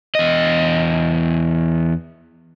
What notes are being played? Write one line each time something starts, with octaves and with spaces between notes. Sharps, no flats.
E2 D#5